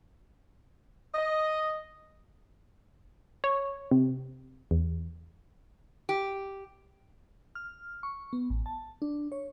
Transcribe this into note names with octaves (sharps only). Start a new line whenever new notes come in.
D#5
C#5
C3
E2
G4
F6
C#6
B3
A1
A5
D4
C#5